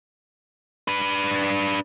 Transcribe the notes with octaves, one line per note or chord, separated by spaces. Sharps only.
D4 B4